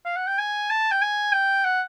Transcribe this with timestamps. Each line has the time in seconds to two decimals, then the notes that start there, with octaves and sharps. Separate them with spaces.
0.05 F5
0.16 F#5
0.27 G5
0.39 G#5
0.70 A5
0.92 G5
1.02 G#5
1.33 G5
1.65 F#5